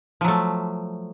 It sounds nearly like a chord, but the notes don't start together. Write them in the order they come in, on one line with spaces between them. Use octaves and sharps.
F3 F#3 A3